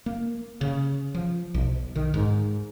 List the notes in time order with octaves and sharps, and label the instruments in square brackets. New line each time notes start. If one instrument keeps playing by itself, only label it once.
[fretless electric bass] A#3
C#3
F3
B1
D#3
G#2